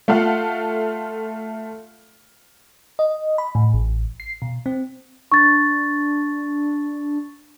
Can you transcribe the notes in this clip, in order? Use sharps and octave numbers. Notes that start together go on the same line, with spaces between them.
A3 F4 A4 F5 F#5
D#5
B5
A2
A1
C7
B2
C4
D4 C#6 A6